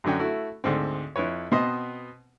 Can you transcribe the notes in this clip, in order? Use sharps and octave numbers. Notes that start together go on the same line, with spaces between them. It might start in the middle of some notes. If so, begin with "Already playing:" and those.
F#2 D3 F#3 C#4 G5
A3 E4 F#4
D2 G#2 D3 C4
F2 E4 B4 C#5
B2 B3 C4 C5 D#5